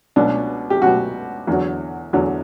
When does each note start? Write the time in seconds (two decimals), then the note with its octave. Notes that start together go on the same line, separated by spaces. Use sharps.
0.16 C#2 B2 F#3 D4
0.70 G4
0.82 C#2 B2 F#3 F#4
1.47 E2 D3 F#3
2.13 E2 D3 F#3